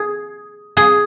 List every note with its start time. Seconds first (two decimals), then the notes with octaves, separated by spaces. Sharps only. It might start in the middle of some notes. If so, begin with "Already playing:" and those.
Already playing: G#4
0.77 G#4